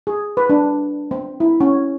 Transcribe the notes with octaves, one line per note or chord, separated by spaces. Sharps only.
G#4
B4
D4
C4
E4
C#4